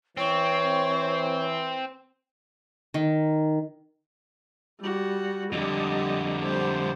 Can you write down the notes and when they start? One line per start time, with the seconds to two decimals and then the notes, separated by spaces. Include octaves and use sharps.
0.17 E3 C4 C#5
2.94 D#3
4.81 G3 F#4
5.52 F2 D3 G3 D#5
6.43 G3 C5